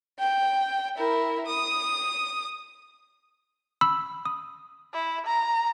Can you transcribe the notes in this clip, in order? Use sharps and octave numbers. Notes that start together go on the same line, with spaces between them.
G5
E4 A#4
D#6
B5 E6
D#6
E4
A#5